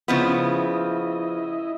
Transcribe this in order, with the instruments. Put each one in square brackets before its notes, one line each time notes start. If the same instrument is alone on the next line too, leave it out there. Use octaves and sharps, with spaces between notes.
[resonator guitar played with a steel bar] C#3 F3 B3 [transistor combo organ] E4 D#5